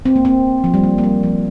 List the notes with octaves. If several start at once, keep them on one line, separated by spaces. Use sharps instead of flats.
C4
A#3
C4
F3
G3
A#3
A#3
G3
F3